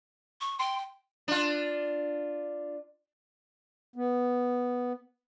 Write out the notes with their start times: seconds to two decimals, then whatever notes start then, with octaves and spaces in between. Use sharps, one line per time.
0.41 C#6
0.59 G5 C6
1.28 D4 F4
3.96 B3